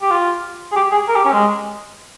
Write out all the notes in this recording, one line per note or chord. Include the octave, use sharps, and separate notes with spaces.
G4
F4
G#4
G4
G#4
A#4
G4
C#4
G#3